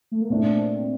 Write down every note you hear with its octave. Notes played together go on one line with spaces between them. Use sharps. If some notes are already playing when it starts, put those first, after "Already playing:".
A3
A#3
A#2 A3 C4 D4